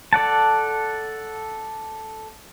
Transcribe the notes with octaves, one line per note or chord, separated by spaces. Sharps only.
A4 D5 F#5 A5